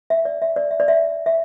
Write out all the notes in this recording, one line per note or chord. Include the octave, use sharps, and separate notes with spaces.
E5
D5
E5
D5
E5
D5
E5
E5